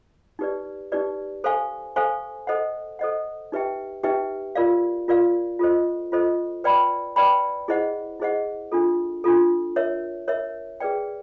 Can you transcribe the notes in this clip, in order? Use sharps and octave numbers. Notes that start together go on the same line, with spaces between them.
D#4 G4 B4 D5
D#4 G4 B4 D5
A4 C5 F5 G#5 C#6
A4 C5 F5 G#5 C#6
A4 C5 D#5 F#5
A4 C5 D#5 F#5
D#4 G4 B4 E5 G5
D#4 G4 B4 E5 G5
F4 A#4 D5 F5
F4 A#4 D5 F5
F4 A4 C5 D#5
F4 A4 C5 D#5
B4 D5 G5 B5
B4 D5 G5 B5
E4 G#4 C5 D#5 F#5
E4 G#4 C5 D#5 F#5
D4 F4 A4
D4 F4 A4
A#4 C#5 E5
A#4 C#5 E5
G#4 B4 D5 G5